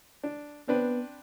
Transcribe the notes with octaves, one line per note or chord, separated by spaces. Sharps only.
D4
B3 C4 D4 B4